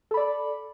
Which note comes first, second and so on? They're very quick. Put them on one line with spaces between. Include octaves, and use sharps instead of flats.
A4 B5 D5